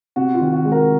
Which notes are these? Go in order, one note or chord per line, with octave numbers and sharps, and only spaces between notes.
C3 F#4
F4
D#3
F#4
G#3
F#4 A#4